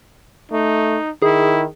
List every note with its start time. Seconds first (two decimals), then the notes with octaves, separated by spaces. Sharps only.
0.52 A3 D#4
1.22 D#3 E4 G#4